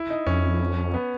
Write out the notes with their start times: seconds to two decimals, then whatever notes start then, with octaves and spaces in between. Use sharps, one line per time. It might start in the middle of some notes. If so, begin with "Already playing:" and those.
Already playing: E4
0.10 D#4
0.26 F2 C#4
0.94 B3